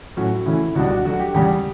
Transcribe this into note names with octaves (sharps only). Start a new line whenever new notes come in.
A2 F#3 C#4 F#4
C#3 E3 A3 C#4 E4
C#2 B2 G3 D4 F#4
F#4
D2 D3 F#3 F#4
G4
E2 C#3 G3 G4